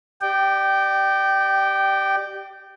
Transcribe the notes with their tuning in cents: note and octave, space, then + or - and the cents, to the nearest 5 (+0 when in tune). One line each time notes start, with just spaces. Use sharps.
G4 -5 D5 +30 G5 -15